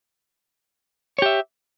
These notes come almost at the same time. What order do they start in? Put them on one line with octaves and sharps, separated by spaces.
C#5 G4 E5